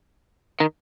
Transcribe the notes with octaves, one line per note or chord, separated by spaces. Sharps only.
D#3